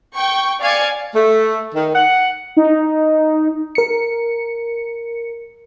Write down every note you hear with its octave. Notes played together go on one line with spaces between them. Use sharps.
G5 C#6
D5 F5 G#5 G#6 C#7
A3
D#3
F#5
D#4
A#4 C#7